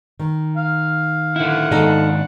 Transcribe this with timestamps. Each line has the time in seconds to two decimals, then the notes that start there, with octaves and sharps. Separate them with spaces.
0.20 D#3
0.57 F5
1.36 D3 E4 F#5
1.71 G#2 D#3 D4 D#4 A4